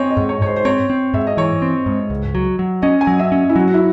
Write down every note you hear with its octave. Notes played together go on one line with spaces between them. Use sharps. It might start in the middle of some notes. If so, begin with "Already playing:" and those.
Already playing: C4 C#5 D#5 G#5
D#5
G#2
C#5
G#2 C5 C#5
C5
C4 C#5
C4
G#2 E5
D#5
E3 C#5
C4
G#2
C#2
F#3
F#3
C#4 D#5
G#5
F#3
E5
C#4
E4
F#3 F#4
F#4
E4